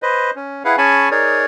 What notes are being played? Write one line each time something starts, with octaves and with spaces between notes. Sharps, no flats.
B4 C5 D#5
C#4
E4 G#4 B4 F5 F#5
C#4 G#4 G#5 A5 B5 C#6
D#4 G#4 A#4 C#5 D5